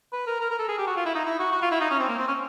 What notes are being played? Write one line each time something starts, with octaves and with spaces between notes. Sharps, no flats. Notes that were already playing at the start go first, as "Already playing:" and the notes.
B4
A#4
A#4
A#4
A4
G#4
G4
F#4
F4
E4
D#4
E4
F#4
F#4
F4
E4
D#4
C#4
C4
A#3
C4
C#4